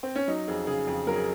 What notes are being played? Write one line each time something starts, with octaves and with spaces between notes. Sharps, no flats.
C4
C#4
F#3 D#4
F2 G#4
C#3 G#4
F2
F#3 A#4
G#4